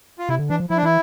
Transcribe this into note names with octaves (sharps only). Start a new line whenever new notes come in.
F4
C3 E4
D3
E3 D4
F3
F3 E4
D4
E3 E4